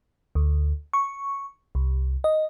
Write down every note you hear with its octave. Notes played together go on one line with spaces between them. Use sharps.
D2
C#6
C2
D#5